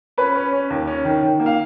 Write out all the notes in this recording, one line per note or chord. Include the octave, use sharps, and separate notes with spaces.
C#4 B4 B5
C#4
C#4
D#2
C#4
D#3
D#3
A#3
F5